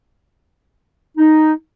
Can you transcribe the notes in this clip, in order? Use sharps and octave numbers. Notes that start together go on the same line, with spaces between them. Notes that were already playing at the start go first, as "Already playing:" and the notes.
D#4